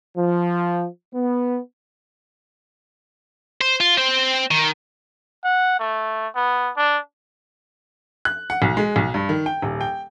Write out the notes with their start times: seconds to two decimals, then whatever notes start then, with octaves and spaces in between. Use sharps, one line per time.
0.16 F3
1.14 B3
3.61 C5
3.80 F4
3.98 C4 C5
4.51 D#3
5.45 F#5
5.79 A3
6.35 B3
6.77 D4
8.25 F#6
8.50 F#5
8.62 B1
8.77 G#3
8.96 B1
9.14 G2
9.29 D#3
9.46 G5
9.62 D#1
9.81 G5